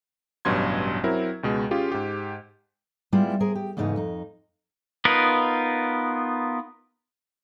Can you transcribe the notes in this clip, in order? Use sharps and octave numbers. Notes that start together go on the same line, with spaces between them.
A1 G2 B2 F#3 C6 G#6
F#3 C4 E4 A#4
C#2 B2 G#3
C#4 F4 G4 G#4
G#2 G4
G3 G#3 B3 E4 F4
G#4 A#4 C5
G4
E2 G#2 C#3 A3 D#4 B4
F2 D#4
B3 D#4 F4 A#4 B4